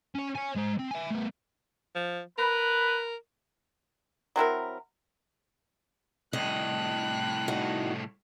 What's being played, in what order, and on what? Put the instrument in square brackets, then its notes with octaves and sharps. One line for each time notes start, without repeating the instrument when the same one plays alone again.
[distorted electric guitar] C#4 C#5
C#5 G#5
G#3 C5
C4
E5 G#5
A3 B3
[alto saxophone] F3
[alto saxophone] A#4 [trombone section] B4
[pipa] F#3 C4 E4 A#4
[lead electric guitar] C2 A2 [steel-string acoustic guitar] D#5 [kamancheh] G5 F#6
[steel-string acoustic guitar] E2 D#4 F#4